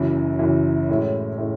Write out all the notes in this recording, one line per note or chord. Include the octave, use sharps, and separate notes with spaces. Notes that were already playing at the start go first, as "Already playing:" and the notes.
Already playing: F#1 F#2 E3
F#1 F#2 E3
A2 G#3 C#4 E4
A2 G#3 C#4